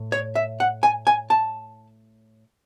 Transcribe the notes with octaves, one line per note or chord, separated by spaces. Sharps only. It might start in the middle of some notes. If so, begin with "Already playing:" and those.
Already playing: A2
C#5
E5
F#5
G#5
G#5
A5